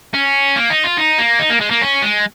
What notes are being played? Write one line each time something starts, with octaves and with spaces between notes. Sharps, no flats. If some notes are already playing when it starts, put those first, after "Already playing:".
C#4
A#3
D#4
F4
D#4
A#3
D#4
A#3
G#3
A#3
C#4
G#3